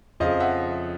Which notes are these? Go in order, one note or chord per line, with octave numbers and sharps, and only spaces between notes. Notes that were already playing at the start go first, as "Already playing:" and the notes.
F2 C#3 F3 D#5 F5
E5 F#5